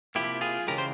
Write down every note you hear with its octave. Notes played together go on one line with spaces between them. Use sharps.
C3 F3 A#3 E4 G4
F4 G#4
C#3 E3 G#3 G4 A#4
C5